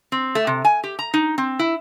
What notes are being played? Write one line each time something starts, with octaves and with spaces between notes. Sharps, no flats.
C4
A3
C3
G#5
G4
A#5
D#4
C4
E4